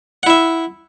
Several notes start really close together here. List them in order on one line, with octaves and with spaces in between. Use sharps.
F#5 E4 E5